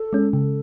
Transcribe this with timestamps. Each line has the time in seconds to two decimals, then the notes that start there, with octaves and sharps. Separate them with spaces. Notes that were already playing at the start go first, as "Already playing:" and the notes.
Already playing: A4
0.13 G#3 C#4
0.33 C#3 A4